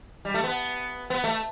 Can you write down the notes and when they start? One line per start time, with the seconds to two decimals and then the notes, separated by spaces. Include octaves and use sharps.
0.25 G3
0.34 A3
0.43 B3
1.10 B3
1.24 A3